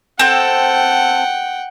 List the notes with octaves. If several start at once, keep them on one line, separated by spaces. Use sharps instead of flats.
C4 A4 F#5 G5